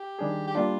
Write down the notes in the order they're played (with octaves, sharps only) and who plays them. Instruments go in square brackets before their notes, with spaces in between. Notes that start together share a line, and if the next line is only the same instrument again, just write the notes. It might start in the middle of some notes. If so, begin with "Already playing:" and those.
Already playing: [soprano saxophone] G4
[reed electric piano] D#3 G3 D4 G#4
[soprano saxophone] G4
[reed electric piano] G3 A#3 D4 [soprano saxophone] F4